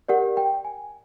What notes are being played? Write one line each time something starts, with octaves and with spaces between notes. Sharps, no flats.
G4 A#4 D5 F#5
G5
G#5